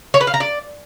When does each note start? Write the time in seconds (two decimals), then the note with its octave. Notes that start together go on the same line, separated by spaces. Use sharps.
0.14 C#5
0.21 B4
0.27 F5
0.34 A#5
0.40 D5